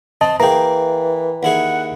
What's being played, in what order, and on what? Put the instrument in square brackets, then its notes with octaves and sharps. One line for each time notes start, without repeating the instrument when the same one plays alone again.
[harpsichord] C4 [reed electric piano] D#5 A5
[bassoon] E3 [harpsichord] A#3 G#4 [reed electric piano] G5 A#5
[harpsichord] D#2 E4 G#4 [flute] F#5